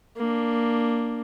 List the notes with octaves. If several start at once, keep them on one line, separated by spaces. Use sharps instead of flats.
A#3 D4